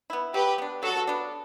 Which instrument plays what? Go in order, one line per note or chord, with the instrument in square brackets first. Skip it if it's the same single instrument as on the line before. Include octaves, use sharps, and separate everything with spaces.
[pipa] B3 E4
[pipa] F#3 [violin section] G4 B4
[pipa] B3 D4
[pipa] F#3 [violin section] F#4 A4
[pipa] B3 D4